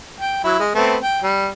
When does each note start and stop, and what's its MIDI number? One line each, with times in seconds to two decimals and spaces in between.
0.20 0.42 79
0.44 0.59 54
0.44 0.59 64
0.59 0.71 56
0.75 0.97 57
0.75 0.97 59
0.75 0.97 60
1.03 1.21 79
1.23 1.51 55